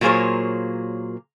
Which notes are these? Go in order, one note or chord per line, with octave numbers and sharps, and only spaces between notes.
A#2 F#3 A#3 G#4 C5 C#5